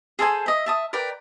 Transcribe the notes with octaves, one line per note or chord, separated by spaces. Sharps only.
G#4 A4 C5 G#5
D#5 E5
E5 A5 D#6
A#4 B4 D5 G5